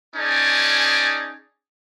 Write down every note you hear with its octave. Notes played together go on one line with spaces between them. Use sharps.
C#4 D#4 G#4 D5 G#5 A5